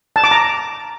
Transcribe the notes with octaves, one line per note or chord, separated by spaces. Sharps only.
A5
D6
A#5